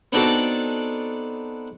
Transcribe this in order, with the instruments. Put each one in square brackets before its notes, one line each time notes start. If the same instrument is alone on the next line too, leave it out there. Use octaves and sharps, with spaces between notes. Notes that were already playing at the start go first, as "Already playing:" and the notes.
[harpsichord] B3 C4 D4 D#4 F#4 A4